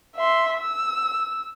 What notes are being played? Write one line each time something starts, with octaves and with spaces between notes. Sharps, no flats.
E5 C6
E6